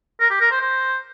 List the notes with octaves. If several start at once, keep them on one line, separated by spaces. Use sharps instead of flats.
A#4
G4
A#4
C5
C5